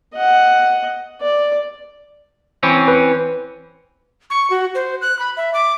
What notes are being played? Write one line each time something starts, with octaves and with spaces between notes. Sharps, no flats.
D#5 F#5
D5
E3 C4 C#4
B4
C#6
F#4
C5
F#6
B5
E5
D6